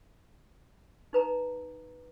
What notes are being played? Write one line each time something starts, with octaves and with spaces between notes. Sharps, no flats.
D#4 B4 A#5